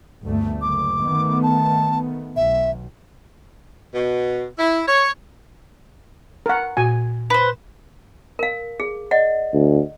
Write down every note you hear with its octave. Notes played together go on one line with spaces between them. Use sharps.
G1 D2 A3
F#1 D6
D#3 A3 B3
A5
B1 E5
B2
E4
C#5
A#4 F#5
A#2 F#4 G#5
B4 C5
A#4 F5
G#4
D5 D#5 F#5
D2